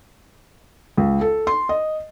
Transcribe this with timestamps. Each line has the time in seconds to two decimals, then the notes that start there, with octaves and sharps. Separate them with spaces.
0.97 C#2
1.21 A4
1.47 C6
1.69 D#5